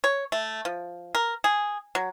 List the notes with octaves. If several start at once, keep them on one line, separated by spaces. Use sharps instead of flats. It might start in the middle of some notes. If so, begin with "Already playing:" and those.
C#5
A3
F3
A#4
G#4
F#3